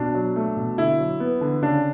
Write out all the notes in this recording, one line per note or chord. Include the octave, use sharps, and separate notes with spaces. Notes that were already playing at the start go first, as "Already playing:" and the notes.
Already playing: B2 D4
F#3
A3
B2
D3 E4
F#3
B3
D3
C#3 D4